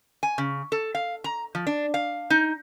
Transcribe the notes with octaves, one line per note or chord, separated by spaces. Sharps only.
G#5
C#3
A4
F5
A#5
F3
D4
F5
D#4